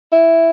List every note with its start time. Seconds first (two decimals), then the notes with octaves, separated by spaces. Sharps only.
0.13 E4